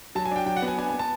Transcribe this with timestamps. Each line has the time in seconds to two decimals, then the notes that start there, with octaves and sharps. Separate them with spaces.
0.15 F#3 A5
0.26 G#5
0.31 D4 G5
0.46 F#3 G5
0.56 F#5
0.62 B3
0.68 G#5
0.78 D4 G#5
0.89 G#5
0.93 B3
0.99 A5